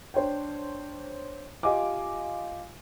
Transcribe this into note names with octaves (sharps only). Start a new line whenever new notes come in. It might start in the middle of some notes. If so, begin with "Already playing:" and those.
D4 C5 C#5 G5
F4 G4 D#5 F5 G#5 D6